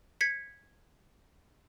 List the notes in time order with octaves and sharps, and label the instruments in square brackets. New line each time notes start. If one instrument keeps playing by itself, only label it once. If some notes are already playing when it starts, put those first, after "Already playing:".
[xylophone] G#6 B6 C#7